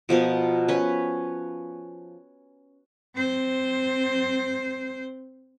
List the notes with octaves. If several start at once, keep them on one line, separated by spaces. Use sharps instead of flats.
B2 F3 B3 A#4
C#4 B4
C4 C5